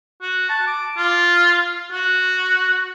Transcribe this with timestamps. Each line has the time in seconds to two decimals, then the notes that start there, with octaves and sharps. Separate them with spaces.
0.21 F#4
0.49 A5
0.67 D6
0.97 F4
1.91 F#4